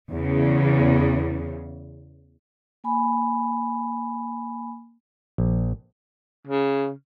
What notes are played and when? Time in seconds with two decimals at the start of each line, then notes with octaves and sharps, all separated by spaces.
0.10 E2 C#3
2.84 A#3 G#5 B5
5.38 A#1
6.47 C#3